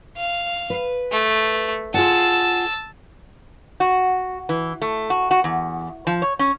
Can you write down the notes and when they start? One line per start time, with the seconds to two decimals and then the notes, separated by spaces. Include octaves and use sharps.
0.17 F5
0.70 B4
1.12 A3
1.94 F4 G#4 F#5 A5 E6
3.80 F#4
4.49 E3
4.82 A3
5.10 F#4
5.31 F#4
5.44 E2
6.07 F3
6.22 C#5
6.39 C#4